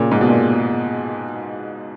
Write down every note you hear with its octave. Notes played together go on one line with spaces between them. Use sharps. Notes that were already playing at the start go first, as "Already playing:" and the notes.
Already playing: A#2 C#3
G#2
B2
A#2